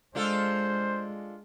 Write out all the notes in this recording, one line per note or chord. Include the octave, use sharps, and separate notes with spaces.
G#3 D4 F4 A4 C5